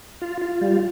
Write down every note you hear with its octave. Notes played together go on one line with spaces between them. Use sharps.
F4
F4
G3